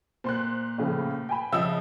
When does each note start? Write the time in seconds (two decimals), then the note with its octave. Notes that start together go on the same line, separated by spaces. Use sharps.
0.24 A#2 C5 C6 F#6
0.78 A2 C#3 F3
1.29 G5 G#5 B5
1.52 C#3 F3 D#5 E5 D#6 E6